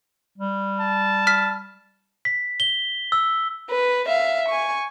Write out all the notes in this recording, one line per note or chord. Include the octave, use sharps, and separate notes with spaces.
G3
A5
F6 B6
B6
G7
E6
B4
E5 F5
G#5 C#6